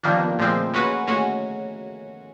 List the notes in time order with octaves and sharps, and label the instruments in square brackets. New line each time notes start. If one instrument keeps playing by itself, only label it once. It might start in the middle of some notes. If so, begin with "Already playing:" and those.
[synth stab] D#3 G3 A#3 D4 [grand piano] F3
[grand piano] B3
A#3
[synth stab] A#2 F3 G#3 C4 [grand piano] A3
[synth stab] G#3 C#4 F#4 B4 [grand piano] A#3
[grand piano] A#3
[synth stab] G#3 C#4 F#4 [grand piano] A3